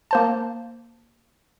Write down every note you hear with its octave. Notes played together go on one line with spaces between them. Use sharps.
A#3 C5 A5